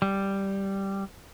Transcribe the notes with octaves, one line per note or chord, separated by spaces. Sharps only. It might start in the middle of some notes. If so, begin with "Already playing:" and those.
G3